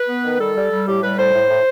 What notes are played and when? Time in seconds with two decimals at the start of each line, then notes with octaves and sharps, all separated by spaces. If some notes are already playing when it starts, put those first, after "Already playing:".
Already playing: B4
0.09 B3
0.24 D#3
0.40 G3 A4
0.55 G3
0.72 G3
0.86 A2 G4
1.02 G3 B4
1.17 A2 C5
1.33 A2
1.48 A2